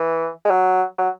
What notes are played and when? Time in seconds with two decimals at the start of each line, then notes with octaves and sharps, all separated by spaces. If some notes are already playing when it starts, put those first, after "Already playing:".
Already playing: E3
0.45 G#3
0.50 F#3
0.98 F#3